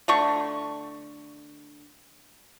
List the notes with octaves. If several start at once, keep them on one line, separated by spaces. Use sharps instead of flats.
D3 A3 C#6